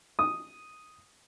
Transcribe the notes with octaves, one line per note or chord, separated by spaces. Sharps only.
D#6